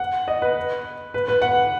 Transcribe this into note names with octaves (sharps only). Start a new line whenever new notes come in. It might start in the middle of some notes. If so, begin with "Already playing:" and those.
Already playing: F#5
D#5
B4
B4
B4
F#5